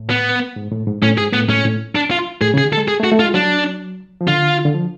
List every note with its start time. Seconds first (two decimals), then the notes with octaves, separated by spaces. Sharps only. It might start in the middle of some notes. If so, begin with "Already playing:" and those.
Already playing: A2
0.10 B3
0.56 G#2
0.71 A2
0.87 G#2
1.02 A2 C#4
1.18 G#2 G#4
1.33 A2 B3
1.49 A2 C#4
1.65 A2
1.95 D4
2.11 F4
2.41 A2 G#4
2.54 C#3
2.58 G#4
2.65 D3
2.73 A4
2.77 G#3
2.88 G#4
3.00 A3
3.04 F#4
3.12 A3
3.20 F4
3.24 G#3
3.34 F#3 D4
4.21 F3
4.27 D3 F4
4.65 D3
4.74 F3